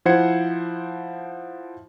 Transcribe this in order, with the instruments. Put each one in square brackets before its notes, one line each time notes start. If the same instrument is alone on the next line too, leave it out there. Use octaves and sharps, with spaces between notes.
[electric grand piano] F3 E4 C5 F#5 G#6 C#7